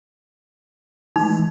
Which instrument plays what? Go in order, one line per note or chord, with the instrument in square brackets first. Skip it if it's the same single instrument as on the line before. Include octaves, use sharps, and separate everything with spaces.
[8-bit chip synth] E3 G#3 A3 [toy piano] D#4